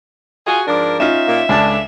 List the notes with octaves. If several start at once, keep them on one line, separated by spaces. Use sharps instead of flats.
F4 F#4 G#4
G#2 F3 D4 A#4
C#4 D#4 F4 E5
A#2 A#3
C#2 A2 C#3 D4 A5